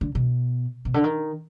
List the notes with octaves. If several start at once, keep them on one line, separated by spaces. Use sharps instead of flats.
D3
B2
B2
D3
D#3